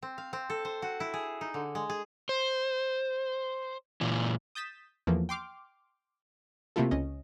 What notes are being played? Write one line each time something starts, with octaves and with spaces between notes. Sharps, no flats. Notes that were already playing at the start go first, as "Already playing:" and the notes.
C4
F5
C4
A4
C5
F#4
E4
G#4
D#4
D3
G#3
G#4
C5
A#2 E3
D#6 G6 A6 B6 E7
E2 E3 F3 A3 A#3
G5 C6 D6 F6
C3 A3 A#3 E4 F4 A4
C#2 C#4 D#5